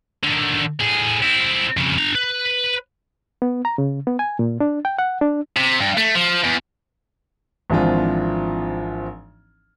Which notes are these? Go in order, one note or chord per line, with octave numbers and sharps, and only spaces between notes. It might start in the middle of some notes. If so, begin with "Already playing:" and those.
D3 D#3
A2 G#4
C4 E4
F2 C#3
D4 A#5
B4
B3
A#5
C#3
B3
G#5
A#2
D4
G5
F#5
D4
C3
G2
A3
F3
E2
G#1 E3 F3 C4 D4 F4